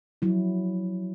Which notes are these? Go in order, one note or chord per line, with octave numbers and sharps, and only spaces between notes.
F3 F#3 E4